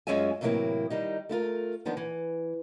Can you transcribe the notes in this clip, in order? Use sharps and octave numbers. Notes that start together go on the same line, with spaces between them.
F#2 G#3 C#4 F4 E5 G#5
A2 C3 E3 F#3 A#3 E4
D#3 G3 D#4
A3 E4 F4 A#4
D#3 F3 B3 D4
E3